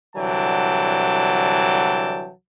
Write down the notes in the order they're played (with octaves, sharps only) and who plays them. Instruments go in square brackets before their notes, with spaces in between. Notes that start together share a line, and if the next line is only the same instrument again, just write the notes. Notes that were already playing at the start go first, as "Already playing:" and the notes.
[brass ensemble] C2 D3 E3 F#3 G5 A5